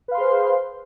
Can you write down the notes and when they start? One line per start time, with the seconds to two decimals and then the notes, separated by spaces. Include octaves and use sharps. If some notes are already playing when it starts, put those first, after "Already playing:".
0.08 B4
0.11 F5
0.14 C6
0.17 G#4
0.20 C5